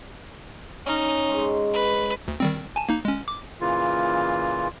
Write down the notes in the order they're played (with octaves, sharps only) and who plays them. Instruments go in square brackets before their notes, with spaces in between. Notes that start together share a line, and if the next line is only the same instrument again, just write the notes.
[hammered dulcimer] C#4 [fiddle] D#4
[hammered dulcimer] G#2 C6
[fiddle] B4
[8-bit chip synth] D2
D#3 G3 C4
G#5 A5
A#3 D#4
G#3 C#4
D6
[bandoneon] A#2 C#3 E3 F4